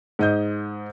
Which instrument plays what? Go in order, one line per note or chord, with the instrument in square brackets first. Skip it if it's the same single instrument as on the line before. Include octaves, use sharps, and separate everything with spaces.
[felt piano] G#2 D#5 G6